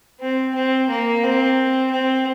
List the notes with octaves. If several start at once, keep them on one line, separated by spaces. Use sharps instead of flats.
C4
C4
A#3
C4
C4